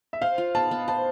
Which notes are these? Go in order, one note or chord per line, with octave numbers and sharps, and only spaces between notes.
E5
C5 F5
F4
B3 A5
B3
C5 A5